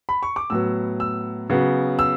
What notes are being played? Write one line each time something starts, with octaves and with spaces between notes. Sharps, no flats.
B5
C#6
D6
A2 F#3 B3 E6
E6
C#3 F#3 B3
E6